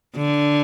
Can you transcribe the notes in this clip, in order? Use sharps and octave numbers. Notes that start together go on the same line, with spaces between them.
D3